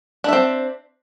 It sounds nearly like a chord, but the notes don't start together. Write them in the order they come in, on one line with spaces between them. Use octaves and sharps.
D4 E5 C4